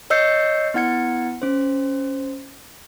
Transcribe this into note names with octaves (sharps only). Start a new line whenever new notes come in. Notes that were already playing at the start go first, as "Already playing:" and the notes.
C#5 D#5 E6 G6 C7 C#7
B3 E4 F#5 G#6 C#7
C#4 C5